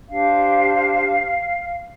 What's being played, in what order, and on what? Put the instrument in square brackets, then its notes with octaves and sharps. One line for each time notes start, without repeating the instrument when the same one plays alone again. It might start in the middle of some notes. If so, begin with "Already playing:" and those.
[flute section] D4 G4 C5 F5